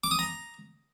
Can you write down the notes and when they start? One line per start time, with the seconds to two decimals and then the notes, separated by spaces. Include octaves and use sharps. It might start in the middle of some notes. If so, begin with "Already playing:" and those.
0.04 D6
0.11 D#6
0.19 A#5